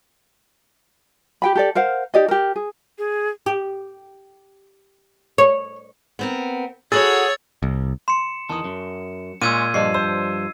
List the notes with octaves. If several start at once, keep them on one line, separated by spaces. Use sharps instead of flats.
G4 G5 B5
G4 A4 D5
A#4 C5 F5 F#5
D#4 G4 D5 D#5
G4 A#4
G#4
G#4
G4
C#5
B3 C4 A#4
F#4 G#4 A4 B4 C#5 E6 A6
C2
C6 C#7 E7
E2 D#3 A5 D#6
F#2
A#2 G#3 C#4 E6 G#6 D#7
G2 F3 G#4 D5 D#5 C7
C5 E6